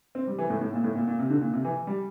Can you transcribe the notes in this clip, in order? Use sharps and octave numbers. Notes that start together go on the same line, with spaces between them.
C4
G3
E3
A2
A2
A#2
A2
A#2
A#2
C3
D3
A#2
C3
E3
G3